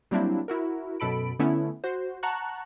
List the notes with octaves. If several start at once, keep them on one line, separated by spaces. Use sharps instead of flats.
F#3 G3 A#3 C4 D4 E4
E4 F#4 A#4
F#2 B2 A4 B5 D7
D3 A3 B3 C#4 E4
F#4 C5
F#5 A5 A#5 C#6 F#6